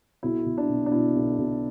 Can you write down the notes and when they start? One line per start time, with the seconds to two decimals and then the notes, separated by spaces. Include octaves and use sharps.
0.23 B1 E4
0.46 B1
0.58 D4
0.69 B2
0.86 D4
0.92 B2 E4
1.16 B1
1.38 B1